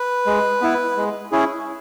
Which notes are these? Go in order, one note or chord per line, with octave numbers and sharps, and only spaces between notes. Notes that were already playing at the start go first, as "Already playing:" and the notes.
Already playing: B4
G#3
B3 E4
G#3
C#4 E4 G#4